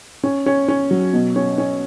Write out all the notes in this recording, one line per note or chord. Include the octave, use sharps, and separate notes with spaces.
C#4
C#4
C#4
F#3
B2
C#4
C#4